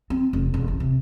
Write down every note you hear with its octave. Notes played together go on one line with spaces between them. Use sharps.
C4
F1
E1
A1
C3